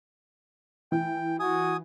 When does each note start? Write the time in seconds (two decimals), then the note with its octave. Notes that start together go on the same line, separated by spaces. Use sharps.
0.92 E3 G5
1.40 F#4 G#5 D#6